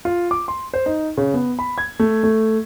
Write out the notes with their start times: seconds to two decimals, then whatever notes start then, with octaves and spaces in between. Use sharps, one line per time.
0.05 F4
0.31 D6
0.48 C6
0.74 C5
0.86 D#4
1.17 C#3
1.34 B3
1.59 B5
1.78 G#6
1.99 A3
2.24 A3